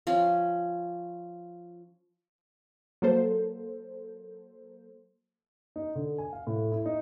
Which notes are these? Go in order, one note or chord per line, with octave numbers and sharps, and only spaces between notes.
F3 C#4
F#3 A#3 A4 C5
D#4
D3
G#5
F5
A2
E4
D#4